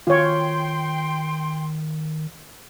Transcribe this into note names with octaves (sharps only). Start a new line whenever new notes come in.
D#3 F4 C#5 G5 C6